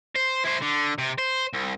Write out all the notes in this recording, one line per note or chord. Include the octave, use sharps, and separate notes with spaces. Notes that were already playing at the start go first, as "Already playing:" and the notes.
C5
E4 C5
D3
C3
C5
C2